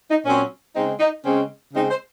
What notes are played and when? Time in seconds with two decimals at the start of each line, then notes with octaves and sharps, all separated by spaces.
0.10 D#4
0.25 A#2 F#3 C4 C#4
0.75 C#3 G#3 C4 D#4
1.00 D#4
1.25 C#3 G#3 C4 C#4
1.74 C#3 G#3 C4 D#4
1.90 C5